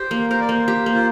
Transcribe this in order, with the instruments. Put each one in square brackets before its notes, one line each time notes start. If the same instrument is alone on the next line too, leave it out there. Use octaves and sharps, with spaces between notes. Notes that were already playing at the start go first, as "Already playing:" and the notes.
Already playing: [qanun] G4 [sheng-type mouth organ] C5
[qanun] A#3
[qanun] A#4 [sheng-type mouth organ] C5
[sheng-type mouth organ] D5
[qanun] A#3 [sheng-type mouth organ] C5
[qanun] G4
A#3
[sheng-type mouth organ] F4